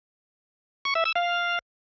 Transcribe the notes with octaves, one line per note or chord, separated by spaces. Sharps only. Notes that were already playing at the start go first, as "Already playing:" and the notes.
C#6
E5
E6
F5